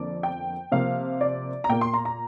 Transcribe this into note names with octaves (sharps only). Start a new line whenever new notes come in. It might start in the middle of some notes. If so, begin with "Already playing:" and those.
Already playing: F2 D3 A#3 D5
G5
C3 F3 A#3 F5
D5
A#5
A#2 A#3 G5
C6
A#5
A#5